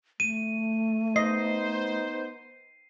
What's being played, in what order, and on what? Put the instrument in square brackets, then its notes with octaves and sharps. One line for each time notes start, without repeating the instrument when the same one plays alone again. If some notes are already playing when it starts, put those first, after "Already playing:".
[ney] A3 [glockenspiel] D#7
[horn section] B3 D#4 C5 [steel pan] D#5 [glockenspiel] C7